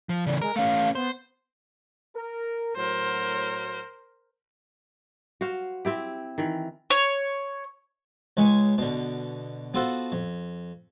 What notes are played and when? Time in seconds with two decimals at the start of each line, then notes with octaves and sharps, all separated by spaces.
0.09 F3
0.26 C#3 E3 D5
0.41 G#3 A#4
0.56 A3 C#4 F5
0.95 B3 C5
2.16 A#4
2.76 A2 F#3 A#4 C5
5.41 F#4 C5 F5
5.85 C4 E4 G4
6.38 D#3 E3
6.90 C#5
8.37 C#2 G#3 B4 C#5 G#5 C#6
8.78 B2 D3
9.74 B3 F4 F#4 A4 C5 F#5
10.12 F2